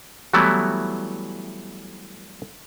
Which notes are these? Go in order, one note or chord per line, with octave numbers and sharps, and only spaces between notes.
E3 F#3 G3 A3 B3 E4